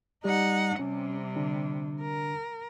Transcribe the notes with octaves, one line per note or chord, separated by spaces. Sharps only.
G3 D#4 G4 F#5
C3 G3 C#4
D3 D4
A#4